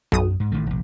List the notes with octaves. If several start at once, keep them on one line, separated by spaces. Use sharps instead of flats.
B1 F#2 D#6
G#2
A1 D#3 A3
F1 A#1